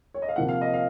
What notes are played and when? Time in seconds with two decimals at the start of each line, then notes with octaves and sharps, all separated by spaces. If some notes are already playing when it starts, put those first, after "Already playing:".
0.14 C#5
0.22 D#5
0.29 F5
0.36 C3 F3 A#3 F#5
0.48 F5
0.61 D#5
0.74 F5